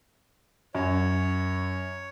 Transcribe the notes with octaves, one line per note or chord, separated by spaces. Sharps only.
F#2 C#5